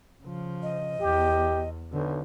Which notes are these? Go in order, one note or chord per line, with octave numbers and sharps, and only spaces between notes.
C#3 F3
D#5
E2 G4
B1 D3